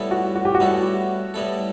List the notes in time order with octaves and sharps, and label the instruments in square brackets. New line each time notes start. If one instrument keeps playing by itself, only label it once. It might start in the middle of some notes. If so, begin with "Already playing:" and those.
Already playing: [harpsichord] A2 G3 B3 E4 A4
[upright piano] F#4
F#4
G4
F#4
[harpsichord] A2 G3 B3 E4 A4
A2 G3 B3 E4 A4